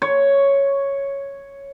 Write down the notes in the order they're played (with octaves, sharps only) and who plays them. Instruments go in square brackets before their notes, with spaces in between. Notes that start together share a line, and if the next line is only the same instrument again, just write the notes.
[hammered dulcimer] C#5